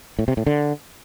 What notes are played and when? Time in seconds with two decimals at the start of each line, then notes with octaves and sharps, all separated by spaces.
0.19 A2
0.28 C3
0.37 A2
0.46 D3